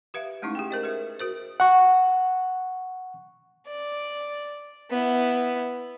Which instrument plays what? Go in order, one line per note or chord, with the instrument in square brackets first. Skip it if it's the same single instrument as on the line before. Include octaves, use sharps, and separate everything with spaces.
[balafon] G4 B4 E5 F5
G#3 A3 C#4 D#4 E4
G4 G#4 G5
A#4 C5 D#5
G#4 B4 E5
F#4 A#4 C5
[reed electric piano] F#5 C#6
[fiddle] D5
B3 E4